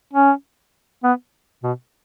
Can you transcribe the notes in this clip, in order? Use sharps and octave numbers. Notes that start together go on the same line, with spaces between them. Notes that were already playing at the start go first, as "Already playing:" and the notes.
C#4
B3
B2